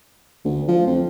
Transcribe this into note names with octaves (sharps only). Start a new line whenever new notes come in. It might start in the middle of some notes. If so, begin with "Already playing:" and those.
D2
F3
F2